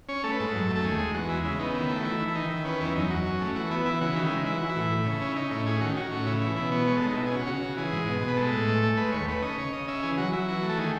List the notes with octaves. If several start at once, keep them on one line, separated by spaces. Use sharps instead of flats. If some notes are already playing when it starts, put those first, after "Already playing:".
C#4 C#5
A3 A4
B4
G#2 A4
F#2
A3
A4
D#2 G#4
G#3
E2 F#4
G#3 E4
C#3 E4
B3 D#4
D#3 E4
A3 E4
F#4
E3 E4
E3
E4
D#3 D#4
D#3 E4
C#4 B4
E2 E4
F#2 D#4
F#2 F#4
C#4
A3
E3 F#4
B3 E4
E3 E4
C#3 F#4
D#3 E4
G#3
E3 E4
E3 F#4
E4
A2
A2
C#3
C#4
E4
C#4 D#4
A2 E4
C#4 G#4
D#3 F#4
C#4 F#4
A2 F#4
C#3 E4
E3
B2 E4
B3 C#5
G#3 C#5
A4
G#3
D#4
B2 E4
G#4
C#4
F#4
C#3 F#4
C#3
E3 G#4
G#2
B2
B2
B4
G#3 A4
A2
A3
A3
G#3 B4
D#2 C#5
A3 B4
C#4 D#5
C#3 C#5
C#3 D#5
C#4 E5
E3 G#4
F#3 F#4
F#3 E4
E3 F#4
A3
A4
D#3 G#4